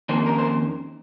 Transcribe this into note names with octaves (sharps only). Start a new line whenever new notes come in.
F2 D#3 A#3 C#4 C5
A#4
C5